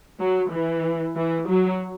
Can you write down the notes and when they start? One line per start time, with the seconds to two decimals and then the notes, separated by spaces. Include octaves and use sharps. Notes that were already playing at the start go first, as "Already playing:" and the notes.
0.19 F#3
0.51 E3
1.15 E3
1.47 F#3